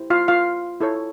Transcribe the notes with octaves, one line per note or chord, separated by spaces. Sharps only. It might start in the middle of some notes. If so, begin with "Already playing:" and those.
Already playing: E4 G4 C5
F4 F5
F4 F5
E4 A4 C#5